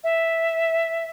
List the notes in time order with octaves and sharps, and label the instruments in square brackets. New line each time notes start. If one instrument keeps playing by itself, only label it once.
[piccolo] E5